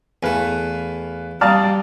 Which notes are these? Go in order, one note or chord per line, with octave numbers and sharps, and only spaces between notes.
E2 A3 B4 F5 G#5
G3 D5 F5 A5 A#5 D#6 A6